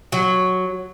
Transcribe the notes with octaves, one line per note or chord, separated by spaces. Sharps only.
F#3